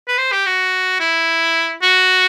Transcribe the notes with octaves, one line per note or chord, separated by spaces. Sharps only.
B4
C5
G4
F#4
E4
F#4